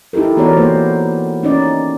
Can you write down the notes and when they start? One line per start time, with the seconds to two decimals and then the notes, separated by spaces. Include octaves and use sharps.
0.13 D#4 E4 G4 A4 A#4
0.37 E3 B3 F#4 A#4 C#5 D5
0.57 A#3 C5
1.43 C#4 D#4 D5